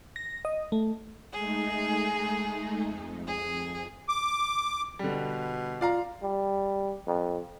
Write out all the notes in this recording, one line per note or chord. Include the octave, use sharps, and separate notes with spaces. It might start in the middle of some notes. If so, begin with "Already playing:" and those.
A#6
D#5
A3
G#3 A3 D#4 G#4
F2
G#4
D6
B2 D3 G3
F4 D5 F5 A#5
G3
F2